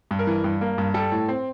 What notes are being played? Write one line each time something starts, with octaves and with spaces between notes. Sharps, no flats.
G2
A#4
E3
G2
A#3
G2
G3 A4
A2
C4